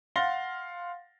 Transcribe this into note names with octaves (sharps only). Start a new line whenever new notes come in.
F5 F#5 C6 A6 A#6 G7